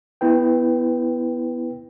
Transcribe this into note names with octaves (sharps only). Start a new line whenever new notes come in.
B3 E4 B4 G5